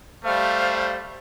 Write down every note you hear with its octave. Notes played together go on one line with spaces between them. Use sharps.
G3 A3 C5 F5 F6